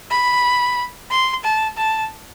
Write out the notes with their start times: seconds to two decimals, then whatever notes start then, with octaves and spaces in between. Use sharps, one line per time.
0.11 B5
1.11 C6
1.44 A5
1.77 A5